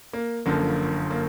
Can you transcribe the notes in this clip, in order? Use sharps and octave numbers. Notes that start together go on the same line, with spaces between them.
A#3
G1 F#2 D3 F3 A#3
A#3